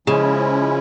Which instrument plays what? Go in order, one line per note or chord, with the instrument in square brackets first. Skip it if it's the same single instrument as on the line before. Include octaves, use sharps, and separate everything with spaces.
[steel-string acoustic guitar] C#3 [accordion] F3 G#3 C#4 E4